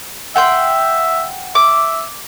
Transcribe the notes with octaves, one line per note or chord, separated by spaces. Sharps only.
E5 F#5 G5 C6
E5 D6